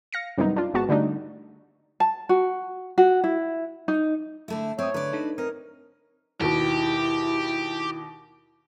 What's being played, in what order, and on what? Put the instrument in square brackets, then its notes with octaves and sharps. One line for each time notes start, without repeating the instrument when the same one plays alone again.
[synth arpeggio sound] F5 A#6 C#7
F#2 C3 D#3 G3 B3 D#4
D4 F4
G#1 G#2 B3 F#4 A5
D3 G3 A3 D4 D#4
[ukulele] A5
F#4
F#4
E4
D#4
[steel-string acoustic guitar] D3 A3 E4
[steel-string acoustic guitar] C4 [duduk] C#5 [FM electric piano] E5 D#6
[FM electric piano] D3 [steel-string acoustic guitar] B4 D5
[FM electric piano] D4 D#4 A4
[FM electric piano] C4 [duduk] A#4 [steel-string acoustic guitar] D#5
[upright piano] D#2 B2 [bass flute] E4 [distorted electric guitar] G4